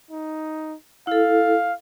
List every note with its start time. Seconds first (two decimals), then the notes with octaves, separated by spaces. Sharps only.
0.11 D#4
1.07 E4 A4 F5